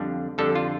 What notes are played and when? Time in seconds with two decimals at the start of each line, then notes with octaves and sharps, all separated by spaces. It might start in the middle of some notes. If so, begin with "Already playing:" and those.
Already playing: F2 D3 G3 D4
0.38 F2 D3 G3 D4 A4
0.55 F4